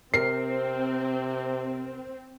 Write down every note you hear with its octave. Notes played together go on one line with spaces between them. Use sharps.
C3 C4 A#4 C7